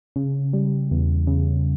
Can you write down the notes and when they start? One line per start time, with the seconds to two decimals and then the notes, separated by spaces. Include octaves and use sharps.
0.16 C#3
0.53 G3
0.91 E2
1.27 C#3